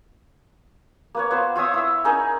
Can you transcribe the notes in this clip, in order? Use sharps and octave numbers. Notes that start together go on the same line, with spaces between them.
A#3 B4 C#5
B3 F4 C5
F4 C#5 E5 D#6
E4 E6
C#4 D#4 G#4 A#4